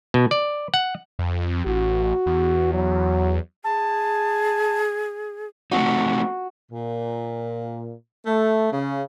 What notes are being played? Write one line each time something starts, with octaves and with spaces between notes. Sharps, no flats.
B2
D5
F#5
F2
A1 F#4
E2
F#3
G#4 A5
A3 C4 D#4 F#4
A#2
A3
C#3